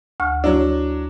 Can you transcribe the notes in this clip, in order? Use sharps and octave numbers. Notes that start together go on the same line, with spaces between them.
D2 C#6 F6
F#3 D4 E4 D5